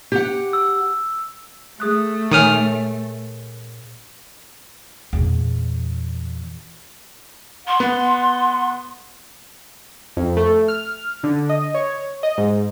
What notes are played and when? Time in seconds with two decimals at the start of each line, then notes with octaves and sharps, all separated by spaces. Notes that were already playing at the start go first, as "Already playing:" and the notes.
0.12 G4 F#5
0.53 E6
1.80 A3 G#4 D#6 F#6
2.32 A#2 D#3 C#5 G#5 D#6 F6
5.13 E2 A#2
7.67 F#5 C6
7.80 B3
10.17 F2
10.37 A3
10.68 F6
11.23 D3
11.49 D#5
11.74 C#5
12.23 D#5
12.38 G#2